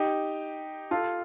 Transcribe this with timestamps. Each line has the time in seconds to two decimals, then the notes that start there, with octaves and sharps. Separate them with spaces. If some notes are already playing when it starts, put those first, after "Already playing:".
Already playing: D#4 G4
0.91 F4 A4